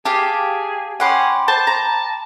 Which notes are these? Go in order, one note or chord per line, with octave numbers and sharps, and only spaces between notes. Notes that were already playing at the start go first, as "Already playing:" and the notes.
G4 G#4 F5 A5
C#4 F#5 G5 B5 C6 D6
C5 A5
A#5